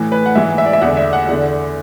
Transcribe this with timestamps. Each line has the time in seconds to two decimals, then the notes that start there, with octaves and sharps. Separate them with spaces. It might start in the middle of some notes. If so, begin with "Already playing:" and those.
Already playing: A2 E3
0.12 B4
0.26 F#5
0.35 G#2 E3 E5
0.58 E5
0.66 D5
0.73 E5
0.82 E2 D3 F#5
0.97 E5
1.13 F#5
1.28 E2 D3